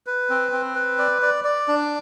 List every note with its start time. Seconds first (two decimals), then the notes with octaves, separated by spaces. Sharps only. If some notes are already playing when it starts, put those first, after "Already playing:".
0.06 B4
0.30 C4
0.52 C4
0.75 B4
0.99 D5
1.22 D5
1.44 D5
1.68 D4